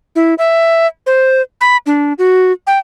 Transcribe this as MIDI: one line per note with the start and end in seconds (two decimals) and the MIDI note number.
0.16 0.34 64
0.38 0.87 76
1.06 1.42 72
1.61 1.77 83
1.86 2.13 62
2.18 2.52 66
2.67 2.79 79